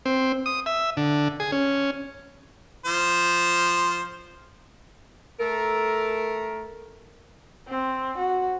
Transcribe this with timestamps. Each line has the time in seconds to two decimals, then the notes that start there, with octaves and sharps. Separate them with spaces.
0.06 C4
0.46 D#6
0.66 E5
0.97 D3
1.40 G#4
1.52 C#4
2.86 F3 C5
5.40 A3 A4 A#4
7.68 C4
8.18 F#4